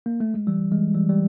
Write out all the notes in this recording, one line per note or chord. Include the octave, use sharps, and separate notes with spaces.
A#3
A3
G#3
E3 G3
E3 G#3
E3 G3
G3